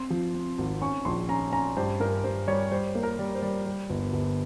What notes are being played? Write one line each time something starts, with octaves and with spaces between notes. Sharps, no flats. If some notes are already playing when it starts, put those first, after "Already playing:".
Already playing: C4 C6
F3
C4
G#1
C#4 C#6
A#1 C6
C#4 A#5
C#4 A#5
G2 C5
G2 A#4
G2 C5
G3 C#5
G3 C5
A#3
A#4
G3
C5
G3
G3
G1
G1